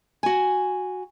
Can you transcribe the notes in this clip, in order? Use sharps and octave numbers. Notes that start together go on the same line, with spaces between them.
F#4 G#5